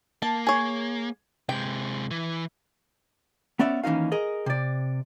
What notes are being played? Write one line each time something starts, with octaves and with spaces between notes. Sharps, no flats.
A#3 A5
G#4 C#5
C3 G#3 G5
E3
B3 C#4 D5 E5
D#2 E3 C#4 D#4 F5
G#4 A#4 D#5
C3 D5